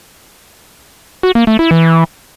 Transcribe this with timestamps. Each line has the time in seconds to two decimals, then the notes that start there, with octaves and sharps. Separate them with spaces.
1.23 F#4
1.35 A#3
1.47 A3
1.59 E4
1.71 E3